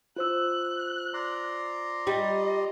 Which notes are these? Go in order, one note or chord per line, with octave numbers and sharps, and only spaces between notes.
F4 C5 E6 F#6
D5 A#5 C6
G3 D#5